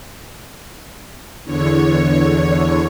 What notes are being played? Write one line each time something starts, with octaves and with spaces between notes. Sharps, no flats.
E2 D3 C#5